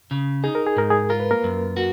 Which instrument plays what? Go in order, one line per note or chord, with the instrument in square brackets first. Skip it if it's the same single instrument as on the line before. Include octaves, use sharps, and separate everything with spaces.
[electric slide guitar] C#3
[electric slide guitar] D#4 [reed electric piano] G#4
[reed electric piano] A#4
G#4
[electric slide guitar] G#2 [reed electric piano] A#4
[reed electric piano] G#3 G#4
[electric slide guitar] F4 [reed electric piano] A#4
[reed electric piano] B4
A#3 A#4
[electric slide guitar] F#2
F#4